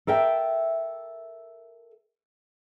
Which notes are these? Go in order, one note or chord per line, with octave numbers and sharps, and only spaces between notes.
A4 A#4 E5 G5